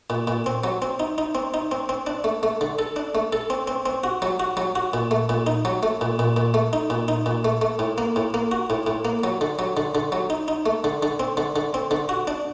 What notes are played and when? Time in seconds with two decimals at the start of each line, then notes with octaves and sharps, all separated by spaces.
0.10 A#2
0.27 A#2
0.46 C4
0.64 F#3
0.82 C4
1.00 D#4
1.18 D#4
1.35 C4
1.54 D#4
1.71 C4
1.89 C4
2.07 D4
2.24 A3
2.43 A3
2.61 D3
2.79 A4
2.96 D4
3.15 A3
3.33 A4
3.50 C4
3.67 C4
3.86 C4
4.04 F#4
4.22 F#3
4.40 F#4
4.57 F#3
4.75 F#4
4.93 A#2
5.11 A3
5.29 A#2
5.47 D#4
5.65 F#3
5.83 A3
6.01 A#2
6.19 A#2
6.37 A#2
6.54 A3
6.73 D#4
6.90 A#2
7.08 D#4
7.26 A#2
7.45 A3
7.62 A3
7.79 A2
7.98 A#3
8.16 A2
8.34 A#3
8.51 F#4
8.70 A2
8.87 A2
9.05 A#3
9.24 F#3
9.41 D3
9.59 F#3
9.77 D3
9.95 D3
10.12 F#3
10.30 D#4
10.48 D#4
10.66 A3
10.84 D3
11.03 D3
11.20 C4
11.37 D3
11.56 D3
11.74 C4
11.91 D3
12.09 F#4
12.27 D4